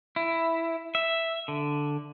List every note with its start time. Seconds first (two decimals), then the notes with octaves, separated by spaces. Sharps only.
0.16 E4
0.95 E5
1.48 D3